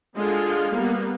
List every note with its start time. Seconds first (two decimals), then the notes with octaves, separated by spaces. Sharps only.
0.16 D3 G#3 F4
0.72 G3 A#3 B3